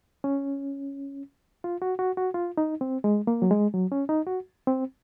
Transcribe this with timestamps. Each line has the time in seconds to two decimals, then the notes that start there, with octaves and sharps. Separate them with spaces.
0.24 C#4
1.64 F4
1.82 F#4
1.99 F#4
2.17 F#4
2.34 F4
2.57 D#4
2.81 C4
3.04 G#3
3.27 A#3
3.42 F#3
3.51 G#3
3.74 F#3
3.92 C#4
4.09 D#4
4.27 F#4
4.67 C4